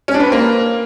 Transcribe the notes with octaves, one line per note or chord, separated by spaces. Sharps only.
C#4
D4
B4
C4
A#3